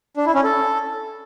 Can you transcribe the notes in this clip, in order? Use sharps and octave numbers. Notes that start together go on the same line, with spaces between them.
D4
E4
C#4
A4